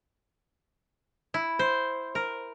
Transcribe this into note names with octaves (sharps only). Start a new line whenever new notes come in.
E4
C5
A#4